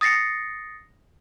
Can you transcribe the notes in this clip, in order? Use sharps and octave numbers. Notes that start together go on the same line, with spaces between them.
D#6 A6 A#6 C7 C#7